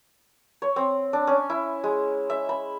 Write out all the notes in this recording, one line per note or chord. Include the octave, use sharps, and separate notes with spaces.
C#5
C4
D4
C#4
E4
G#3
E5
B5